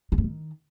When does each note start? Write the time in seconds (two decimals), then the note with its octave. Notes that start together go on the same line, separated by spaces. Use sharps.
0.12 D#3
0.18 G2
0.24 D#3